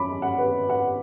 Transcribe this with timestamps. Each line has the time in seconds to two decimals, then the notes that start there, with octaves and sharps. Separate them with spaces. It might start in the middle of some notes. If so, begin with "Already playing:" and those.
Already playing: F#2 C#4 B5 D6
0.22 F#5
0.38 B4
0.69 F#5